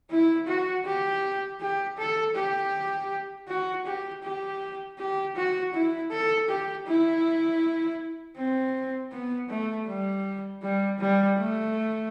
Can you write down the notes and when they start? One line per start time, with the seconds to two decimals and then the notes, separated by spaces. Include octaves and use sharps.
0.11 E4
0.48 F#4
0.86 G4
1.61 G4
1.98 A4
2.35 G4
3.48 F#4
3.86 G4
4.23 G4
4.99 G4
5.36 F#4
5.73 E4
6.12 A4
6.49 G4
6.87 E4
8.37 C4
9.12 B3
9.49 A3
9.88 G3
10.63 G3
10.99 G3
11.38 A3